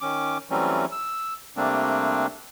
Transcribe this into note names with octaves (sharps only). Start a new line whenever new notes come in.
D#3 C#4 D6
E3 F#3 G3 A3 C4 C#4
E6
C3 G3 A3 A#3 C4 D4